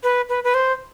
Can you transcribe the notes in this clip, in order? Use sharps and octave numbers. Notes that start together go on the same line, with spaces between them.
B4
B4
B4
C5